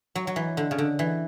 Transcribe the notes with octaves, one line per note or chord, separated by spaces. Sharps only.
F#3
F#3
E3
D3
C#3
D3
E3